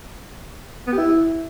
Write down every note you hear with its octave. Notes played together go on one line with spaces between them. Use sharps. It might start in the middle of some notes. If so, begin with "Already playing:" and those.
B3
G4
E4